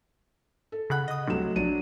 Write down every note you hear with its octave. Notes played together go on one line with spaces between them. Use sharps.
A4
C#3 F#5 B5 F#6
D#5 D#6
C2 C3 F#3 A3 E7
A#1 F#3 D4 D#7